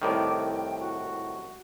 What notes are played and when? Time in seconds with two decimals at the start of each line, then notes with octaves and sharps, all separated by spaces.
0.02 C2 A2 D#3 D6
0.47 G5
0.80 F#4